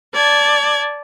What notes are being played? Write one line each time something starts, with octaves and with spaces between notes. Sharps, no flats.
D5 A5 G#6